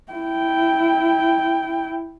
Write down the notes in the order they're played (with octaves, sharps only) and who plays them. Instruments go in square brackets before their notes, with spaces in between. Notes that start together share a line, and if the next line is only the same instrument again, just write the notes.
[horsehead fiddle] E4 G5